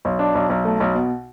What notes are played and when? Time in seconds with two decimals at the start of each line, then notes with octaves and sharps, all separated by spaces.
0.05 B1
0.19 D4
0.35 B1
0.50 B1
0.65 A3
0.80 B1
0.95 B2